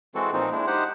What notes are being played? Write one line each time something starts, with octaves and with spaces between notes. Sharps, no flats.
E3 G#3 C4 F#4 A4
A#2 F3 C4 D#4
G#3 D4 E4
D#4 G4 C5 F#5